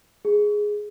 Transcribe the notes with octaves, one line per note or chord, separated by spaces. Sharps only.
G#4